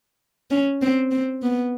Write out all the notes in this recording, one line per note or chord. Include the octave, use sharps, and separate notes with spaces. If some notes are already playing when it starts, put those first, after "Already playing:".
C#4
C4
C4
B3